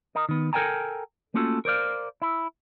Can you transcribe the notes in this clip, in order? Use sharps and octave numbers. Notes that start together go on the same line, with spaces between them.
A#4 D#5
D#3 B3
A4 A#4 C#5 G5 G#5 A#5
A3 A#3 C#4 F4 F#4 A4
A#4 C5 D5 F5
E4